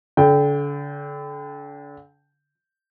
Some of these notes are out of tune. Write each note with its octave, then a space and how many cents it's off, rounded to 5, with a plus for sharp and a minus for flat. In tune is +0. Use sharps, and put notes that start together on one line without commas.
D3 -35 G5 +0